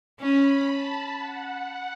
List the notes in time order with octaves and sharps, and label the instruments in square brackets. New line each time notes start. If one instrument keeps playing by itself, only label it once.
[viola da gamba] C#4 [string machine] B5
[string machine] A5
F#5